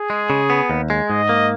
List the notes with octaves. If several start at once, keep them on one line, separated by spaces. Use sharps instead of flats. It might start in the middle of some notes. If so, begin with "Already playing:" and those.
Already playing: G#4
G#3
C#3
B3
D#2
G#3
G#2 D#5
A#3